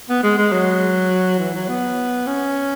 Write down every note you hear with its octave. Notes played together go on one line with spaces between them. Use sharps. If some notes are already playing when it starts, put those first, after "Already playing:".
B3
G#3
G#3
F#3
E3
F#3
B3
C#4